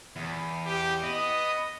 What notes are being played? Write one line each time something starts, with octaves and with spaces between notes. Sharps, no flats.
E2
G4
B3 D#5